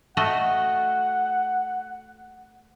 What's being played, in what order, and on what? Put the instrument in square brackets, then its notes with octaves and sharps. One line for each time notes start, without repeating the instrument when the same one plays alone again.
[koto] A3 F#4 D#5 [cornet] F#5